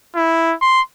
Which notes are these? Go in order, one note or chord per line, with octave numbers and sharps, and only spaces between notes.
E4
C6